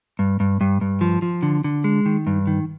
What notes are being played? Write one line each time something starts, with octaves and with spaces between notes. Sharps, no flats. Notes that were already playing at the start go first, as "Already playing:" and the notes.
G2
G2
G2
G2
F3
F3
D3
D3
G#3
D#3
G2
D#3